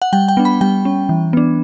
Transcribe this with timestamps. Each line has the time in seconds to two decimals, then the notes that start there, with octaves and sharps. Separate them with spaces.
0.02 F#5
0.13 G3 G5
0.28 G5
0.37 B3 D4
0.45 B5
0.61 G3 G5
0.85 C#4
1.09 E3
1.33 B3 D4